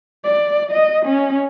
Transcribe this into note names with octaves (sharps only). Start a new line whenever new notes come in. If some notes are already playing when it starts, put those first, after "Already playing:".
D5
D#5
C#4